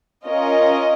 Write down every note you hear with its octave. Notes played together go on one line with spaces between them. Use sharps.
C#4 F4 A#4 D#5